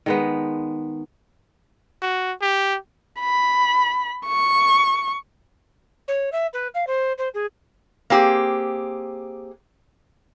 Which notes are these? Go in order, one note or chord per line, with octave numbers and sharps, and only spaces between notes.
D#3 G#3 B3
F#4
G4
B5
C#6
C#5
E5
B4
F5
C5
C5
G#4
A#3 C4 G4 G#4